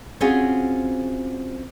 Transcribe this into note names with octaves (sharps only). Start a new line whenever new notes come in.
C4 C#4 F4 F#4 G#4